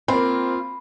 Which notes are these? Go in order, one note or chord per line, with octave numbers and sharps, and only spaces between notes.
A#3 C4 F4 B5